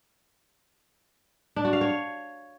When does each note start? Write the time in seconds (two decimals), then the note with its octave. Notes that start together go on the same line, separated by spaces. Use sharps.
1.56 D4
1.65 F#4
1.73 F5
1.81 C#5